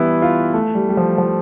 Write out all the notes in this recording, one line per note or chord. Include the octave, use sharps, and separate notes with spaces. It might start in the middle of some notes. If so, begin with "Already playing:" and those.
Already playing: E3 G3 B3 E4
F4
A3
G3
G3
F3
F3